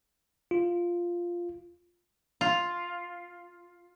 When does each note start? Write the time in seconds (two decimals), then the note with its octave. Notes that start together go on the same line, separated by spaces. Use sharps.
0.51 F4
2.41 F4